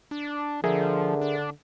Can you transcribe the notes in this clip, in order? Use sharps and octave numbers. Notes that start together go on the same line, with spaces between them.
D4
D3 F3 G#4 A#4 E5
D4